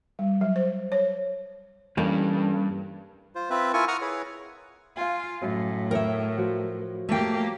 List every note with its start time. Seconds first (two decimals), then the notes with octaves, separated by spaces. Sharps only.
0.19 G3
0.41 F#3
0.56 C5
0.92 C#5
1.97 G2 E3 G3 A#3 C#4 A4 D5
3.35 F4 C5
3.50 C4 F4 B4 E5
3.74 E4 F4 A#4 G#5 C#6
3.88 F#5 A#5 C#6 D#6 F6
4.01 E4 G#4 B4 C#5
4.97 F4 F5 G#5
5.42 F#2 A2
5.91 A#4 C#5 E5 G5
6.37 F3 F#4
7.09 A3 A#3 G4 G5